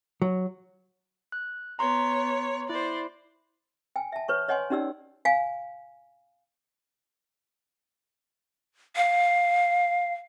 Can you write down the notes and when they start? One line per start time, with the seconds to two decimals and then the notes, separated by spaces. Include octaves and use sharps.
0.22 F#3
1.32 F#6
1.79 B3 C#5 A#5 C6
2.69 E4 C5 D5
3.96 G5 G#5
4.12 E5 A5
4.28 B4 C#5 C#6
4.48 C#5 D#5 F#5 G#5 C6
4.70 C#4 D#4 G4 D5 E6
5.25 F5 G#5
8.96 F5